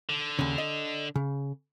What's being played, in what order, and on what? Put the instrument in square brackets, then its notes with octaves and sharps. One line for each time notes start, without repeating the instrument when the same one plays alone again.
[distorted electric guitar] D3
[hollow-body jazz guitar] D#2 C#3
D#5
C#3